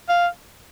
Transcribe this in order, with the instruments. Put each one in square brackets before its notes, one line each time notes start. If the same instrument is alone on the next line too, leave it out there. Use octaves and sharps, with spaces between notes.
[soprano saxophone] F5